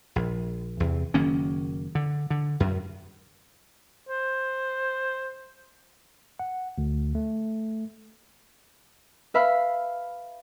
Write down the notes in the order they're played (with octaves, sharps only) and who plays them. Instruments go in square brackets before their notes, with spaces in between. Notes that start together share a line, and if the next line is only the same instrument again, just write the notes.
[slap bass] A#1
E2 C3
F#1 D#3 A#3 C#4
D3
D3
F#2
[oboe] C5
[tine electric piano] F#5
D2
A3
[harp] B4 E5 F5 B5